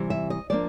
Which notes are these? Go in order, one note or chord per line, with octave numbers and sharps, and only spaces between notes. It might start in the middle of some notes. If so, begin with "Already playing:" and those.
Already playing: C3 E3 G3
E5
D#5
F3 A#3 D4 D5